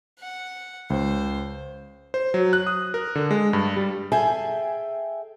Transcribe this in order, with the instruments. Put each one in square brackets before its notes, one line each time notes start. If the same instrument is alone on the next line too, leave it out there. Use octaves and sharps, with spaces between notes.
[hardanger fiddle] F#5
[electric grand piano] C#2 [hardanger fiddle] C5
[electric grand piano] C5
F#3
F#6
D#6
A#4
D3
G#3
G2
G3
[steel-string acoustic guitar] G#4 A4 E5 G5 G#5